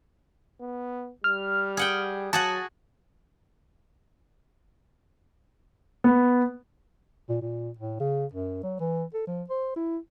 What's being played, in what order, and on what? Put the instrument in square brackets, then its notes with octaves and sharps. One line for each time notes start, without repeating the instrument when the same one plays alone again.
[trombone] B3
[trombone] G3 [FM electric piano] F6
[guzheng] G#4 F#5 G5
[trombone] F#3 [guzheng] F#4 G#4 F#5 [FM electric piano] A5
[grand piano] B3
[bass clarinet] A#2
A#2
A2
C#3
F#2
F#3
E3
A4
F3
C5
E4